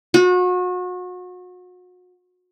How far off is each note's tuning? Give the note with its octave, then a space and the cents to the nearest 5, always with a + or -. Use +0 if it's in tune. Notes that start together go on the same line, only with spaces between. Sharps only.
F#4 -35